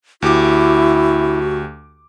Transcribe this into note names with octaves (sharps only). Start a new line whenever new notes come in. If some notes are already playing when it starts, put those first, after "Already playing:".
D2 E4 F#4 G4 D6